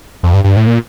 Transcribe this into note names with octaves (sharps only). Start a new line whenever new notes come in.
F2
G2
G2
A2
A#2